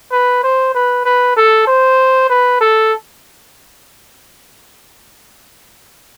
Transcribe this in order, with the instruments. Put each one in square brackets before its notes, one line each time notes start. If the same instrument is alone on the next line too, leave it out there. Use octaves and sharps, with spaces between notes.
[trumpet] B4
C5
B4
B4
A4
C5
B4
A4